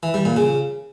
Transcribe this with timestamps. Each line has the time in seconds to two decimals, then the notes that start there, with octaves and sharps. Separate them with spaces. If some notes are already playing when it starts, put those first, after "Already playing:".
0.03 E3
0.14 G3
0.25 A#2
0.37 C#3